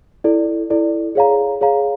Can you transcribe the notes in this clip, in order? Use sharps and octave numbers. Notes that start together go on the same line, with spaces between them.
E4 A4 D5
E4 A4 D5
G#4 C#5 F5 A#5
G#4 C#5 F5 A#5